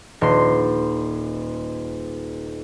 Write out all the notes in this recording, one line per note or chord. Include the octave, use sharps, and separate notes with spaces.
D#1 C6